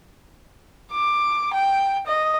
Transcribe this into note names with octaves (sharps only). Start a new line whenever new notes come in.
D6
G5
D#5